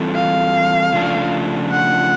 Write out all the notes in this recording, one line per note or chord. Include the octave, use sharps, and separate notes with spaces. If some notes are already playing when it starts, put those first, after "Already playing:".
Already playing: E3 G3 C4 F4 A4
F5
C#3 F3 A3 D4 F4
F#5